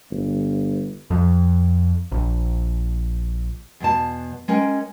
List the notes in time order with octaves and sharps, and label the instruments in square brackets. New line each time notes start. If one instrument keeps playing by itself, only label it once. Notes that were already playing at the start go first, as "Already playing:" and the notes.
[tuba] G1
[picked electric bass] F2
A#1
[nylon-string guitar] E2 B2 A5
G#3 C#4 A#4 G5